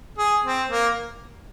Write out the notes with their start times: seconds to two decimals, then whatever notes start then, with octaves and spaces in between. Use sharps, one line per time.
0.18 G#4
0.45 C4
0.70 A#3